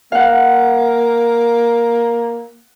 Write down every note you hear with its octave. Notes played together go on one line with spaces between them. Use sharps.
A#3 F5 F#5